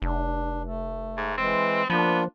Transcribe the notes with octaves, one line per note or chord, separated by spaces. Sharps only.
F1 D4
A3
G#2
E3 G#3 C4
F3 A#3 B3 D4 F4